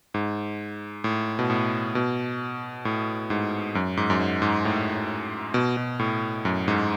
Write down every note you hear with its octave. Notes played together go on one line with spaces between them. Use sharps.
G#2
A2
B2
A2
B2
A2
G#2
F#2
G#2
F#2
G#2
G#2
A2
B2
B2
A2
F#2
G#2